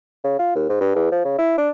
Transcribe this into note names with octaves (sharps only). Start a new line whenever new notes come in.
C#3
F4
D#2
G#2
G2
E2
F3
C#3
E4
D4